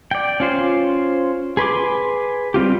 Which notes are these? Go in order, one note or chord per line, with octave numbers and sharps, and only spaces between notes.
D5 G5
C#4 F4 C5
G#4 B4 C6 D6
G3 C4 F4 G4